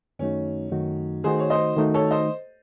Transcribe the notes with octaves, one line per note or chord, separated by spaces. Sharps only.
F#2 D#3 A3 C#4 D#4 F#4
F#2 D#3 A3 D#4 F#4
D#3 A3 D#4 F#4 G#4 C5
C#5
C5 D#5
D#3 A3 D#4 F#4
A4 C#5
C5 D#5